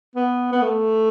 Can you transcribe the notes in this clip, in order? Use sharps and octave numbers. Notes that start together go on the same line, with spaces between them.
B3
B3
A3